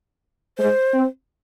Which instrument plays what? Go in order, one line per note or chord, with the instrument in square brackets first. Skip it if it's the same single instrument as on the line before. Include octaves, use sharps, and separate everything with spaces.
[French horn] G#3 [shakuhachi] C5
[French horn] C4